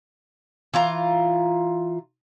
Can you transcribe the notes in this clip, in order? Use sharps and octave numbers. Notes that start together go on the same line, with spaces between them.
E3 F4 A#5